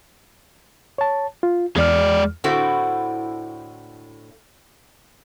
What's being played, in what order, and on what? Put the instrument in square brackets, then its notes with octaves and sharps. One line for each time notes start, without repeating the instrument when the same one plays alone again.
[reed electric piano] C#5 A5
F4
[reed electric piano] E2 F6 [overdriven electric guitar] G#3 D5
[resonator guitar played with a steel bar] A2 D3 A3 C4 E4 F#4